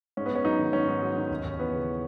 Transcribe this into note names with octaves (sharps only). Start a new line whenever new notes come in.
G#2 C#4
B3
G#2 C#4
F#3 D#4
D#3
G#2 C#4
G#2
F#3
D#3
D#2
D#2
E3 B3
C#3